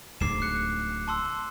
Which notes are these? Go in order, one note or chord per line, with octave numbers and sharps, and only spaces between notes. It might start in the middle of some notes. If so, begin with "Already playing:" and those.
D1 D2 G#2 D6 C7 E7
F#6 C#7
A5 C6 E6